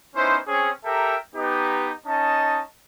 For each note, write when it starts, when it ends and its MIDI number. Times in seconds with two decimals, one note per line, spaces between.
0.16 0.37 59
0.16 0.37 61
0.16 0.37 63
0.16 0.37 64
0.16 0.37 72
0.48 0.71 60
0.48 0.71 61
0.48 0.71 68
0.85 1.15 67
0.85 1.15 69
0.85 1.15 70
0.85 1.15 76
0.85 1.15 79
0.85 1.15 82
1.35 1.91 59
1.35 1.91 63
1.35 1.91 67
2.06 2.61 61
2.06 2.61 63
2.06 2.61 75
2.06 2.61 81